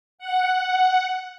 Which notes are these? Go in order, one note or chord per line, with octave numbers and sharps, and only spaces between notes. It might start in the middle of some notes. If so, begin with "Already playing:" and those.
F#5